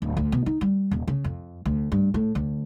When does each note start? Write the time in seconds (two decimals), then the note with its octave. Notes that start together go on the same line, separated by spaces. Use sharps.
0.02 D1
0.17 D2
0.32 B2
0.46 D#4
0.61 G3
0.91 D#1
1.08 C#3
1.24 F2
1.65 D2
1.92 G2
2.14 A2
2.35 D2